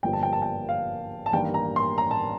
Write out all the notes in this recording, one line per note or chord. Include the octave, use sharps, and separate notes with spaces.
G1 G2 F3 A#3 G5
A5
G5
A5
G5
F5
A5
A1 G2 D#3 A#3 G5
A#5
C6
A#5
A5